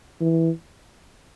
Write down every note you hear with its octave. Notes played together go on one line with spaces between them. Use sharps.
E3